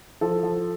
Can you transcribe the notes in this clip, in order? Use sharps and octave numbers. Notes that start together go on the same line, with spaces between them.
F3 A4
F3